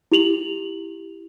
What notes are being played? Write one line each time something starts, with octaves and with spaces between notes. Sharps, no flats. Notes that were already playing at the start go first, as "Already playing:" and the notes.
E4 G4 F7 F#7